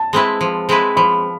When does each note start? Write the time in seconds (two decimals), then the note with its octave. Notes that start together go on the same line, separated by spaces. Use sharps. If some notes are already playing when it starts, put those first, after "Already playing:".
Already playing: A5
0.13 G#3 C4 E4 B4
0.41 F3
0.69 G#3 C4 E4 B4
0.96 F3 B5